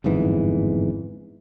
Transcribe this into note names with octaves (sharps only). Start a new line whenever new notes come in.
G1 F2 G#2 E3